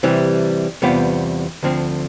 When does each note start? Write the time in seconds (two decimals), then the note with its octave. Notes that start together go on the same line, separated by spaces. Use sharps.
0.03 C3 E3 G3
0.82 E2 C3 G3 B3 F4
1.63 D2 D3 F3 C4